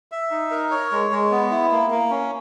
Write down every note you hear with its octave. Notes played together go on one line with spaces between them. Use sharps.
E5
D#4
A#4
C#5
G#3
G#3
B3
E4
A#3
A#3
C#4